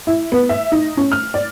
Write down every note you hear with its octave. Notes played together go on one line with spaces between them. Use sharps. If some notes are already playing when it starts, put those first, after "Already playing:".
E4
B3
E5
D#4
C#4
F6
D5